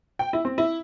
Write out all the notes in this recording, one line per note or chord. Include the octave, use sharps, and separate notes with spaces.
G5
E4
C4
E4